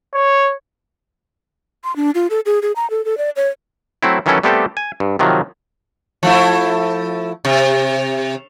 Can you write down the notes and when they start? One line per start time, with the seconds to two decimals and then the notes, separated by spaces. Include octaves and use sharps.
0.14 C#5
1.84 C6
1.96 D4
2.15 F4
2.30 A4
2.46 G#4
2.62 G#4
2.76 A#5
2.90 A4
3.05 A4
3.18 D5
3.36 C#5
4.03 F#3 A3 C4 E4
4.26 D#3 E3 F#3 C#4 E4 A4
4.43 G3 A3 B3 C4 G4 A4
4.77 G#5
5.00 G2
5.19 C3 D#3 F3 F#3
6.23 F3 A3 E4
7.45 C3